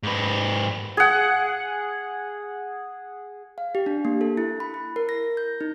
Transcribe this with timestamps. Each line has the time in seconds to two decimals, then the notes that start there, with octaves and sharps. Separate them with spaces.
0.03 G#2 B4
0.97 G#4 F#5
3.58 F5
3.75 G4
3.86 D4
4.05 A#3
4.21 A4
4.37 E4
4.60 B5
4.74 E4
4.96 A#4
5.09 A#6
5.37 G6
5.61 D#4